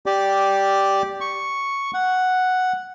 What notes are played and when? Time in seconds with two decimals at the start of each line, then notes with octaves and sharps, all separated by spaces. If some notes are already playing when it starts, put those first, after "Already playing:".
0.06 G4 D5
1.21 C#6
1.94 F#5